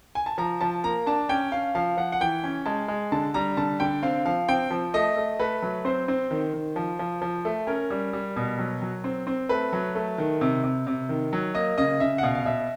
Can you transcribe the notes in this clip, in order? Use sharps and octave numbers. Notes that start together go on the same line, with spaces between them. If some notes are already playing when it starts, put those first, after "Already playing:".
G#5
A5
F3 A#5
F3 A5
A#3 A#5
D4 A5
C#4 G5
C#4 F5
F3 F5
F3 F#5
F#5
E3 G5
C#4
G#3 A5
G#3
D3 A5
G3 A#5
D3 A5
D3 G5
C4 F5
F3 F5
C4 G5
F3
A3 D#5
A3
A3 B4
F#3
C4 C5
C4
D#3
D#3
F3
F3
F3
A3
C#4 A#4
G3
G3
B2
F#3
F#3
C4
C4
A3 B4
F#3
A3
D#3
C3
C3
C3
D#3
F#3
A#3 D#5
C#3 D#5
C#3 E5
F#5
B2 F5
F5
B2 E5